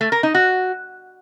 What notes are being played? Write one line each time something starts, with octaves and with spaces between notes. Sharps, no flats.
A3
A#4
D#4
F#4